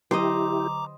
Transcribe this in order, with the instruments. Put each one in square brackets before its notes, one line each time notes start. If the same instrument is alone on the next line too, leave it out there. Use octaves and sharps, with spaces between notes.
[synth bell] D3 F#3 [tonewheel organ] E4 G4 [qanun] C5 D#5 [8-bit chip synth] A#5 D6